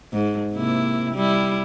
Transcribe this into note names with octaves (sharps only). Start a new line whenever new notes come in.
G#2
C3 A#3 E4
G3 E4